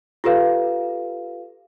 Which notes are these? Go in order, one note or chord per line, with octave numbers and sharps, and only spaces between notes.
F4 G4 A4 B4 F5